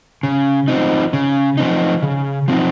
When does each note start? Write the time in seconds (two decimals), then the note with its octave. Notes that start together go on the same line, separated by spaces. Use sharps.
0.23 C#3
0.68 F3 C4 D#4
1.13 C#3
1.57 F3 C4 D#4
2.02 C#3
2.48 F3 C4 D#4